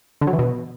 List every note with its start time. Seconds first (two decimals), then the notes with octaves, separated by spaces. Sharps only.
0.21 D3
0.27 F#3
0.33 E3
0.39 B2